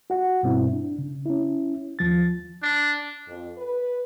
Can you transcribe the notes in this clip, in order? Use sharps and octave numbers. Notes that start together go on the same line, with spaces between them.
F#4 F#5
G2 B2 C4 E4
D4
C#3
C#4 E4
D#2 F3 A6
D4
F2
B4